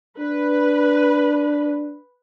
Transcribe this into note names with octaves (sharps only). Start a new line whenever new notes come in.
D4 B4